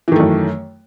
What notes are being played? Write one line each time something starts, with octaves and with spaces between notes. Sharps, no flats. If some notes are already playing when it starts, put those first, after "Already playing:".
F#2 D#3 E3 A3